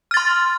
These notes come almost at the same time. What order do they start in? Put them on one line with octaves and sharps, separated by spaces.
F6 A6 C6